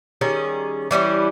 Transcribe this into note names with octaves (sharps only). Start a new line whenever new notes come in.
D#3 G3 C#4 G#4
E3 G3 C#4 E4